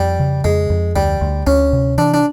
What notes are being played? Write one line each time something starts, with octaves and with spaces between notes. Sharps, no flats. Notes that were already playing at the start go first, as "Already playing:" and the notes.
Already playing: F2 G3
C#3
F2 G#3
F2
D2 G3
D2
D2 C#4
C3
E3 D4
D4